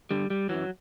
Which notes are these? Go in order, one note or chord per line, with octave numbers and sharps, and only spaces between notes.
G2 D3 G3
G3
F#2 E3 F#3